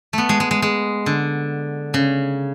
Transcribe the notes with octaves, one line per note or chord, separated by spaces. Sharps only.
A3 B3
G#3
G#3
G#3
G#3
D3
C#3